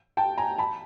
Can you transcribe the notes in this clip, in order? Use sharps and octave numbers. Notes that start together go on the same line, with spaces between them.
G5 A5
G#5 A#5
A5 B5